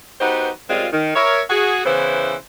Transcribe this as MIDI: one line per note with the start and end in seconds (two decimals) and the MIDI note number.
0.21 0.50 59
0.21 0.50 63
0.21 0.50 66
0.21 0.50 67
0.21 0.50 71
0.21 0.50 72
0.70 0.87 42
0.70 0.87 55
0.70 0.87 56
0.70 0.87 60
0.70 0.87 65
0.93 1.13 51
1.16 1.42 70
1.16 1.42 73
1.16 1.42 76
1.50 1.81 66
1.50 1.81 68
1.85 2.35 49
1.85 2.35 52
1.85 2.35 59
1.85 2.35 64
1.85 2.35 72